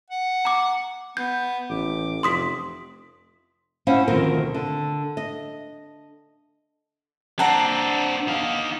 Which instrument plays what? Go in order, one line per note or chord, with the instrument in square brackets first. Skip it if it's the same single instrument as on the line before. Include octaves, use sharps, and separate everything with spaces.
[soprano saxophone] F#5
[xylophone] A#5 D6
[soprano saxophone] B3 [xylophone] G6
[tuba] A1 [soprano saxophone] D6
[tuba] F1 [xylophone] C6 D#6 B6
[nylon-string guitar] C#4 E4 C5 F5 F#5
D2 B2 D#3 F3 C4 A#4
D3
D#5
[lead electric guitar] C4 D4 [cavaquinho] F#5 A5 A#5
[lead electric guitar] D#4 F5